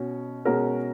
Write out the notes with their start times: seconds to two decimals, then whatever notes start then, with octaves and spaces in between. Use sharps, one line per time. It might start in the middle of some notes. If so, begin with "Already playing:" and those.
Already playing: B2 C#4 F#4
0.45 B2 G#3 C#4 F#4 A#4